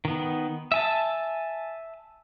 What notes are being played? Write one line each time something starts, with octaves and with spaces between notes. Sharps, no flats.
D#3 B3
E5 G#5 A5